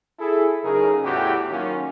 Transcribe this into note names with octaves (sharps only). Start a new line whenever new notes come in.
E4 G#4 A4
F#2 C#3 D#4 G#4 A#4
E2 A2 E3 F#4 G4
D#3 F#3 A#3 C#4 F4 F#4